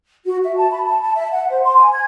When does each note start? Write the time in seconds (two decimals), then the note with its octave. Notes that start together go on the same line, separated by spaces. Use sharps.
0.25 F#4
0.44 E5
0.57 A5
0.71 B5
0.85 A5
1.02 A5
1.16 E5
1.32 F#5
1.49 C5
1.64 C6
1.77 G#5
1.93 G#6